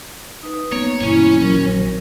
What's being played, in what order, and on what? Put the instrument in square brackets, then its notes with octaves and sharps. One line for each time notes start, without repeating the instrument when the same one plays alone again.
[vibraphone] D#4 B4
[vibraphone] A#3 [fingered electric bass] B3 [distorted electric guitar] C#5
[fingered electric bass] G2 B2 E3 [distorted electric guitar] C#4 C#5 [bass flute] E4
[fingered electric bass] A#2 E3 [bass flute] F#3 [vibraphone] C4 A#4
[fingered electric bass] A#1 D#3